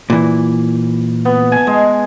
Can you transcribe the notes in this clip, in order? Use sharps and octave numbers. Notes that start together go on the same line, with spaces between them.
A#2 E3
B3
G#5 A5
G#3